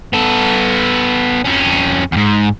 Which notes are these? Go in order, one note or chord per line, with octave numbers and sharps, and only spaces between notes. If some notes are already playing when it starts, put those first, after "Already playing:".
B3 A4
F2 C#4
E2 G#2